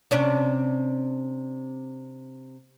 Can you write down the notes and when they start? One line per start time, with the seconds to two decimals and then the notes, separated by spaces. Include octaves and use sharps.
0.11 C3 C#4 D4